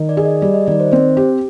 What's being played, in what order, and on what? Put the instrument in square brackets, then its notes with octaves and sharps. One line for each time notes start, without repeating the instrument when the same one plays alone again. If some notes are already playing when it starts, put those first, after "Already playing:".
Already playing: [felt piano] D#3
[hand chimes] D5
[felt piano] G#4
[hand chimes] D#5
[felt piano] G3 [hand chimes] D5
[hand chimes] D#5
[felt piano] D#3 [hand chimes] D5
[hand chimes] C5
[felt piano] C4 [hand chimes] C5
[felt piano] G4